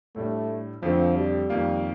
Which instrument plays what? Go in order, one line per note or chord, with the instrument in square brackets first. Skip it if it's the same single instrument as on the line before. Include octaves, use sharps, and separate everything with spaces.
[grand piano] A2 G3 D4 [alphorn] A3
[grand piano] F2 D3 A3 C4 [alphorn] F3
[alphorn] G3
[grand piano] F2 D#3 A#3 F4